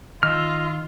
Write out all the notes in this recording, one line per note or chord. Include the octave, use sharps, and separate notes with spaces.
D#3 F4 D#5 E6 F6